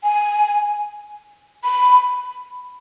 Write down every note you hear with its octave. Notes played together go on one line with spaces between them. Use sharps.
G#5
B5